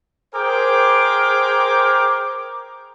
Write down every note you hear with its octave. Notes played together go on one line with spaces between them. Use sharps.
G#4 A#4 C5 G5 D6